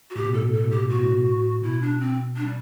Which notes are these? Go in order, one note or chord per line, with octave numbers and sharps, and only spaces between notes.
F#4
A2 G4
B2
A2 A4
B2
A2 A4
B2
A2
G4
B2
A2
B2 F#4
A2
B2
A2
B2 E4
D4
C4
D4
G3